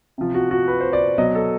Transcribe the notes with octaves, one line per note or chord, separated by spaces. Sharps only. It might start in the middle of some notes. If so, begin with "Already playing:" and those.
C3 F3
F#4
F#4
B4
C5
D5
B2 F#3 D#5
A4